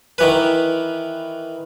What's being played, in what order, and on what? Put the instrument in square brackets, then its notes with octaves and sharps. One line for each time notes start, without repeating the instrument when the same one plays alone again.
[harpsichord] D#3 E3 B4